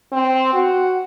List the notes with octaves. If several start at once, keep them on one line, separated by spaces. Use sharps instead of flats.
C4
F#4